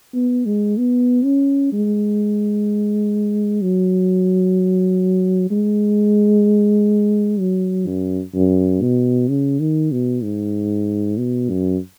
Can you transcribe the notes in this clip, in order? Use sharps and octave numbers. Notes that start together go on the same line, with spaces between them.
B3
G#3
B3
C#4
G#3
F#3
G#3
F#3
F#2
F#2
B2
C#3
D#3
B2
G#2
B2
F#2